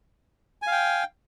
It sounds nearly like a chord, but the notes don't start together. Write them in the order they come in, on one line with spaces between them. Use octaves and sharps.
G#5 F5 G5